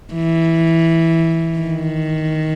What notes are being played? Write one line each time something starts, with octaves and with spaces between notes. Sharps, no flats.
E3
D#3